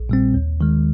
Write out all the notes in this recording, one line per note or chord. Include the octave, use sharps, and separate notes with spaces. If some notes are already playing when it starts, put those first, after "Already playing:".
Already playing: A#1
A#2 G3 C4
D#2
D#3 G#3